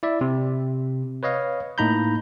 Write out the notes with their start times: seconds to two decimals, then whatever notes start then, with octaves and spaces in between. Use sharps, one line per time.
0.03 E4 D5 E5
0.21 C3
1.23 B4 C#5 D#5 F5
1.78 A2 A#3 D#4 A#5 B5 G6